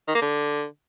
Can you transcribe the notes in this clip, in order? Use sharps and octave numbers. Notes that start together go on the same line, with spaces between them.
D#3
A#3
D3